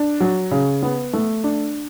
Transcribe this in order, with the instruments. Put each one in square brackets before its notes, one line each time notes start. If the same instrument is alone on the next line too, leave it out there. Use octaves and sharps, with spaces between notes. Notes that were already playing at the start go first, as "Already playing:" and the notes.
Already playing: [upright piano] D4
F#3
C#3
B3
A3
D4